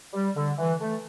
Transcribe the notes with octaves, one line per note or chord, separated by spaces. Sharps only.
G3
D3
E3
A3